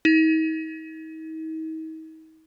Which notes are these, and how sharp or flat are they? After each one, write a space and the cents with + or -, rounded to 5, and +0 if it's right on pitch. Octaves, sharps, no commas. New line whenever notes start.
D#4 +40